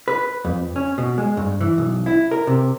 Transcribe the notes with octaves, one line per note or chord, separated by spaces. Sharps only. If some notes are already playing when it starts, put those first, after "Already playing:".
B4
F2
C#4
B2
G#3
G2
E3
B1
E4
A#4
C3